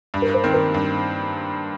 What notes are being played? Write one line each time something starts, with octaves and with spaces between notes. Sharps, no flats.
G2
A#4
C5
D#3 C4
A#4
G2